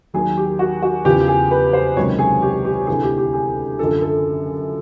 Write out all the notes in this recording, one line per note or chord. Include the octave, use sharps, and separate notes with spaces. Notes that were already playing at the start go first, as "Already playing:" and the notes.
D#2 D#3 F#3 G#4
G4
F#4
F#4
E2 C#3 F3 G4
G#4
B4
C5
C#2 C3 D#3 F#3 C#5
G#4
G4
G4
D2 C3 E3 G#4
G4
G4
G#4
F#2 D3 F3 A4
A4